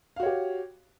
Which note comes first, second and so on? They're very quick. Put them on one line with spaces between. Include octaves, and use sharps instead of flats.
F5 F#4 C#5 G4